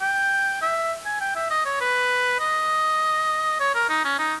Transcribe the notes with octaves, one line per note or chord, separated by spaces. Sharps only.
G5
E5
G#5
G5
E5
D#5
C#5
B4
D#5
C#5
A#4
D#4
C#4
D#4